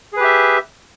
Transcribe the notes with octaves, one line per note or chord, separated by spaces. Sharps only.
G4 G#4 B4 E5